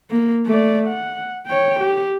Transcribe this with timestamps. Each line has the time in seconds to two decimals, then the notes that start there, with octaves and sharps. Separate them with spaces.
0.11 A#3
0.46 A3 D5
0.88 F#5
1.47 C#5 G5
1.80 G4